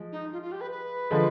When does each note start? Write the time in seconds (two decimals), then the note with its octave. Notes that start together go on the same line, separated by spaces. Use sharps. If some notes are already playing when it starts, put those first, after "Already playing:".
Already playing: F3 G#3
0.12 D#4
0.32 F4
0.42 F4
0.52 G4
0.61 B4
0.71 B4
1.11 D3 F3 G#3